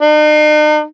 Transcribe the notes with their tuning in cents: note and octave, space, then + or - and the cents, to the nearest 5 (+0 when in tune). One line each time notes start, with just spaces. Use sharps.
D#4 -45